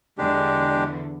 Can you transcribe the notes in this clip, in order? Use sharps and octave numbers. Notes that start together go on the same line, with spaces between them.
E2 D3 G#3 D4 G4